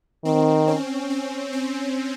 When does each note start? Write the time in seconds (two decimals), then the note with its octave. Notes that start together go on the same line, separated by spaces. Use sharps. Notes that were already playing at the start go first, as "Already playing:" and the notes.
0.25 D#3 C4
0.68 C#4
1.10 C#4
1.53 C4